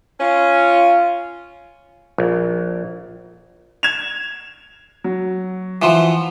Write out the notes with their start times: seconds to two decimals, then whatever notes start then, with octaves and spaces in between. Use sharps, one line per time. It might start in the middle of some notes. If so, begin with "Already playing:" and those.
0.19 C#4 F4
2.18 A#1
3.83 G#6 E7 F7
5.04 F#3
5.82 E3 F3 F#5 C6